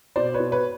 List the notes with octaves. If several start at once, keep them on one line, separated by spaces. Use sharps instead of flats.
B2 C5 D5
B4 C#5
B2
B4 C#5